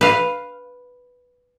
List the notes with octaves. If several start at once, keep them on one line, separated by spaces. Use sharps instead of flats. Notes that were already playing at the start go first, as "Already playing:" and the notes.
B4 F5